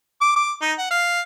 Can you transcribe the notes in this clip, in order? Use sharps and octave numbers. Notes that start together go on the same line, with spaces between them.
D6
D6
D#4
F#5
F5